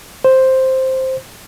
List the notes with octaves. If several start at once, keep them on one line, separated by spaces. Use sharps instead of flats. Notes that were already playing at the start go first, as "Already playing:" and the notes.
C5